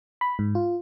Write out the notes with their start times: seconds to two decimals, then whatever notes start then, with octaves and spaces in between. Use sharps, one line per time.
0.21 B5
0.39 G#2
0.55 F4